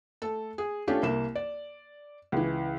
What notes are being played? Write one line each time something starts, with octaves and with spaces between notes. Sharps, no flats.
A3 A4
G#4
A3 C#4 D4 F4 G4 A4
C2 A#3 E7
D5
C#2 E3